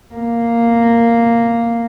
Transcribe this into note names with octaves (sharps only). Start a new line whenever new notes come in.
A#3